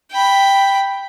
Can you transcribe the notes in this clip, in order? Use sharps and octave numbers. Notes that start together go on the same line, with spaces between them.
G5 B5